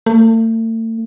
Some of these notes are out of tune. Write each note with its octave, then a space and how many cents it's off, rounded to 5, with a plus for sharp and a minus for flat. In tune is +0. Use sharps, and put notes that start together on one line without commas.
A3 +40